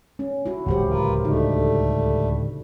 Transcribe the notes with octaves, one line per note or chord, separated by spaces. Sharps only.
C#4
E4 F#4
D1 C#2 E3 G4 C5 F#5
F4 A#4 B4
D3 G3 A3 D#4 F#4